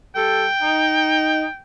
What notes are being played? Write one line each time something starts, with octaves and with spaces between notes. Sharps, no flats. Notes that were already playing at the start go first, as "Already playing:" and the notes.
G3 A4 G5
D#4